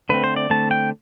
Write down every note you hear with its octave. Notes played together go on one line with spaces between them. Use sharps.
D3 A3 C4 B4
C5
D5
D3 A3 C4 A5
G5